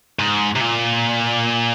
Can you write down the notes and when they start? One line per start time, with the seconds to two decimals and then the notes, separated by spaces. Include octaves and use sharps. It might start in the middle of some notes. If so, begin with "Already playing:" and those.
0.19 G#2
0.56 C3
0.61 A#2